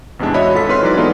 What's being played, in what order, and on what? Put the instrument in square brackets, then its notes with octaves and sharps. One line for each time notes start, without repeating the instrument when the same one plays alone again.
[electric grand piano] A1 E2 C3 G#3 D4
F#4 C#5 D#5 E5 B5
G#1 F4 A4 B6
G#2 C4 B4 C#5 C6 F6
E3 F#3 D#4 B4 D5
G#3 B3 D#4 F4 A4